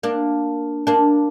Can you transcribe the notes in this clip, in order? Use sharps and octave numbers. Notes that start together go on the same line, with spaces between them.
A#3 D4
A#3 D4